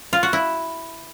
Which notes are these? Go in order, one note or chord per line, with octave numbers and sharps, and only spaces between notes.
F4
F#4
E4